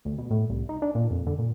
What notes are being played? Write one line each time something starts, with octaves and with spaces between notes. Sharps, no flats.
D2
B2
A2
C2
D#4
D4
A#2
F2
D3
A#2